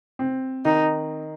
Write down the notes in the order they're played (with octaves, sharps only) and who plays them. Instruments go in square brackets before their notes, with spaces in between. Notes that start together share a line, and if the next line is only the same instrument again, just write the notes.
[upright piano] C4
[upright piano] D#3 [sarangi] D#4